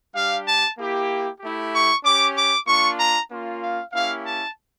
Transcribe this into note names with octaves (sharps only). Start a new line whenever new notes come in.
G3 D4 G4 F5
A5
A#3 E4 G4
A3 E4 G4
C#6
C#4 G4 D6
D6
A#3 D4 F4 C#6
A#5
A#3 C#4 F4
F5
A#3 C#4 E4 G4 F5
A5